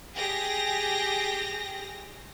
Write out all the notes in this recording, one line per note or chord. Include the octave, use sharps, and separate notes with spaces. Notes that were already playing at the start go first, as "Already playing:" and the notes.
G4 G#4 A#6